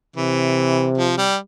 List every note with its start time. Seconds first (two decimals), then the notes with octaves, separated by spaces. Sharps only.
0.17 C3 E3
0.98 F3
1.18 G3